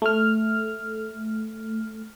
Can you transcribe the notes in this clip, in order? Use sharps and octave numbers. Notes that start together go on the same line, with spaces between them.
A3 F6